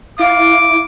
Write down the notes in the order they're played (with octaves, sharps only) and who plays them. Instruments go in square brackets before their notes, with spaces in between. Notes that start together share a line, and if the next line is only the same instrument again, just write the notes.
[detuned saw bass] E4 [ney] F5 [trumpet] D6